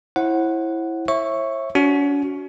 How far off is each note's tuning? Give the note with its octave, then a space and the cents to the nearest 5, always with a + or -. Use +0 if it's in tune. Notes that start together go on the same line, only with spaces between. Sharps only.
E4 +0 C5 +45 F#5 +0
C#5 -40 E5 +0 C#6 +0
C#4 +45 F#4 +0